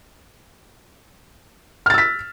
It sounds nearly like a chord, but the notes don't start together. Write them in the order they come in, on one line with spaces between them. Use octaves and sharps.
F6 A6 E6 B6